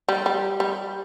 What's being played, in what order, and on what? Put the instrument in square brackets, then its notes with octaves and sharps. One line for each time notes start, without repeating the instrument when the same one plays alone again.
[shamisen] G3
G3
G3